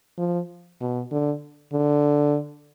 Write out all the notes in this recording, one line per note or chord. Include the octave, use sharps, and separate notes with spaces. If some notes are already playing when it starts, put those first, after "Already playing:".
F3
B2
D3
D3